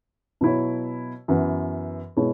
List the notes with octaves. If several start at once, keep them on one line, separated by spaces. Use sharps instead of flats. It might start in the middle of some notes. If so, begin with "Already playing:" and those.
B2 F#3 E4 C#5
F#2 E3 B3 F#4 B4
B2 G#3 E4 C#5